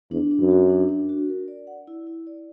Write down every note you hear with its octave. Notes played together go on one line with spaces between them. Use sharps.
E2 D4
D4
F#2
F#4
D4
D4
F#4
A#4
D5
F#5
E4
E4
D5